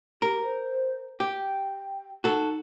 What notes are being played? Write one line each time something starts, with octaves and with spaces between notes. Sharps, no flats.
G4 A#4
C5
G4 G5
D#4 F#4 A4